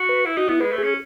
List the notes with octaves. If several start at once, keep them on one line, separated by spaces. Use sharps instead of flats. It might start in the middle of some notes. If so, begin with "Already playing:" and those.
Already playing: F#4
B4
E4
D#4 F#4
B3 E4
G#3 B4
A3
G#4
C#4